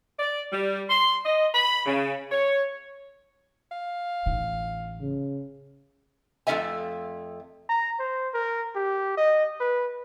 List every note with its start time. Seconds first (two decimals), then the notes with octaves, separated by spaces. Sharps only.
0.19 D5
0.52 G3
0.89 C6
1.25 D#5
1.54 B5
1.86 C#3
2.31 C#5
3.71 F5
4.26 A1 D#4
5.01 C#3
6.47 F2 A3 C4 A4 E5 G#5
7.69 A#5
7.99 C5
8.34 A#4
8.75 G4
9.17 D#5
9.60 B4